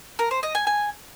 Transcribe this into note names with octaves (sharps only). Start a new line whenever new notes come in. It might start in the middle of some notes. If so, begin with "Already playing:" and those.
A#4
C5
D#5
G#5
G#5